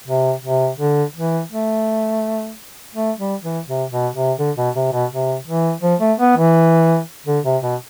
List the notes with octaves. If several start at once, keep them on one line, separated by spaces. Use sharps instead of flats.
C3
C3
D3
E3
A3
A3
G3
E3
C3
B2
C3
D3
B2
C3
B2
C3
E3
F3
A3
B3
E3
D3
C3
B2